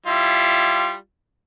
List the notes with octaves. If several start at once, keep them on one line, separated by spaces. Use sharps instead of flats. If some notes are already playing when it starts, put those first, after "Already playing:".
G3 E4 F4